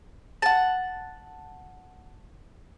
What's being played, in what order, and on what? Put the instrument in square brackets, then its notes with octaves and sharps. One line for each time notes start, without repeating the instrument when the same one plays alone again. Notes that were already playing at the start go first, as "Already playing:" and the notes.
[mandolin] F#5 A5